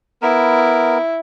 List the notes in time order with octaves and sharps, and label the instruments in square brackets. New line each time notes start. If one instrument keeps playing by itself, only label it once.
[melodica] B3 A#4 [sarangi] E4